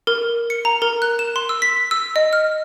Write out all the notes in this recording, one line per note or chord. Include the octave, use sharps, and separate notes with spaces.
A#4
C#7
A#5
A#4
F#6
E7
C6
E6
B6
E6
D#5
F6